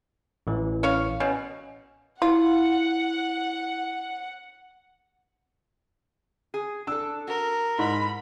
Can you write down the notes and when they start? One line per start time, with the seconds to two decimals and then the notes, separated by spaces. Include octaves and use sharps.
0.47 A1 E3
0.83 C#4 C#5 F5
1.20 B2 C#4
2.22 E4 F4 F#5
6.54 G#4
6.87 D4 A4 E6
7.28 F#4 A#4
7.79 G#2 B5